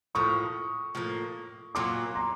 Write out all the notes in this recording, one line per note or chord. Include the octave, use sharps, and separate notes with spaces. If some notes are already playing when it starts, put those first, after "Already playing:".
A2 F3 A#3 C#6 D#6
A2 F3 A#3
A#2 F#3 A#3 C6 D6
A#5 C6